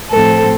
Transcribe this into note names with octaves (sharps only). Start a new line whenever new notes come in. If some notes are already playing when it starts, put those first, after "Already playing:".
A2 F3 C4 A4